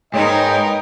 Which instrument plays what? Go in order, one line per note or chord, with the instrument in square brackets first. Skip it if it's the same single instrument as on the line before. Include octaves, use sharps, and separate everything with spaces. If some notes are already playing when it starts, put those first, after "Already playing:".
[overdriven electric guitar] G#2 [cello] D#4 A#4 [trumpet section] B4 D#5 G5 [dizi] C#5